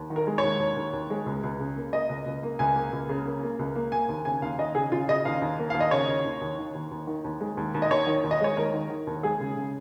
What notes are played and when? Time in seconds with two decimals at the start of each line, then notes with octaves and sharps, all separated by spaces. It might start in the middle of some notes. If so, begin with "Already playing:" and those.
Already playing: D#2
0.10 D#3
0.16 A#4
0.27 G#3
0.38 D#2 C#5
0.60 D#2
0.77 D#2
0.93 D#2
1.10 G#3
1.26 C#2
1.43 C#2
1.60 C#3
1.76 A#3
1.93 A#3 D#5
2.09 C#2
2.26 C#2
2.43 A#3
2.59 C#2 G#5
2.76 A#3
2.92 C#2
3.09 C#3
3.25 A#3
3.43 A#3
3.59 C#2
3.76 A#3
3.92 A#3 G#5
4.09 D#2
4.25 C#3 G#5
4.42 D#2 F5
4.58 D#2 D#5
4.75 C#3 G#4
4.92 C#3 F4
5.08 C#3 D#5
5.25 D#2 F5
5.42 D#2
5.59 A#3
5.70 D#2 F5
5.80 D#5
5.91 C#3 C#5
6.08 D#2
6.25 D#2
6.41 D#2
6.58 D#3
6.75 D#2
6.91 D#2
7.07 D#3
7.24 D#2
7.40 G#3
7.57 D#2
7.74 D#2
7.82 D#5
7.90 D#2 C#5
8.07 D#3
8.24 D#2
8.31 D#5
8.41 G#3 C#5
8.57 D#2 A#4
8.73 D#3
8.90 D#3
9.07 D#2
9.23 G#3 G#4
9.40 C#3
9.56 C#3